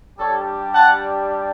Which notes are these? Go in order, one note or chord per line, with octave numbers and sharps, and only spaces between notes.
G3 D4 G4 A4 C#5
F#5 A5